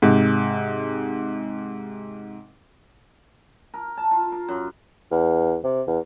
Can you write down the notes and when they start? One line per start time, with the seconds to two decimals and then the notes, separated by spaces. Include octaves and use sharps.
0.02 G#2 C3
3.74 A#4
3.97 A5
4.11 F4
4.32 A#4
4.49 F#2
5.11 E2
5.64 C3
5.87 E2